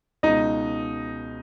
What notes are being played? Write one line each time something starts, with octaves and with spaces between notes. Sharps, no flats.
C#2 B2 D#4 D#5